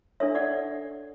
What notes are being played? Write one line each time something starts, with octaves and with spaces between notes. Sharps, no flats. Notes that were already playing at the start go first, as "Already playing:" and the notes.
D4 A4 C#5 E5
D5 F#5